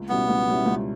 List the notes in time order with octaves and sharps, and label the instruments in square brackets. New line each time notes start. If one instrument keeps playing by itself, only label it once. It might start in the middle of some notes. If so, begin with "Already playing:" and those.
Already playing: [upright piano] C#2
[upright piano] B2 G3 C#4 E4 [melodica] B3
[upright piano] C#2
B2 G3 C#4 E4
C#2